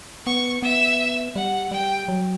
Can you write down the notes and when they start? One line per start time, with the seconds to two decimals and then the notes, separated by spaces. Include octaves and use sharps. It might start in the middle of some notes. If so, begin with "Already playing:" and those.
0.26 B3 C#6
0.63 B3 E5
1.36 G3 F#5
1.71 G3 G5
2.08 F#3